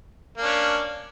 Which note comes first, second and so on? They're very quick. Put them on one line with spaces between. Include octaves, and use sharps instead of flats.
A#3 D4 C#4